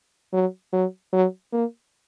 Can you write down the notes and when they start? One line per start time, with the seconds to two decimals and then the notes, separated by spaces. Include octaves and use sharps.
0.33 F#3
0.72 F#3
1.13 F#3
1.53 A#3